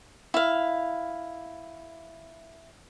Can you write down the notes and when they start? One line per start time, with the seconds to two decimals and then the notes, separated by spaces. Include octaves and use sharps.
0.34 E4 F5